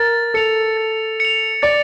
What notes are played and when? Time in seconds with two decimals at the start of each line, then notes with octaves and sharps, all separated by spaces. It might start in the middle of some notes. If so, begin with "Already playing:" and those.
Already playing: A#4 A6
0.34 A4 C#7 F7
0.77 A6
1.20 C#7 F7
1.62 D5 A6